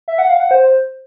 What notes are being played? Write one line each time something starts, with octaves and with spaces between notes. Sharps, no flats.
E5
F#5
F5
F#5
C5